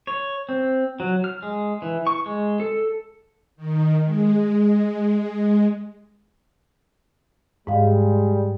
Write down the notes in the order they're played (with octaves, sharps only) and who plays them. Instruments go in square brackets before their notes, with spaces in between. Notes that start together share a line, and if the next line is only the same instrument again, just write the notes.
[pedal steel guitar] C#5
C4
F#3
F6
G#3
E3
C#6
G#3
A4
[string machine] D#3
G#3
[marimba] G#2 F5 [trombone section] G3 G#3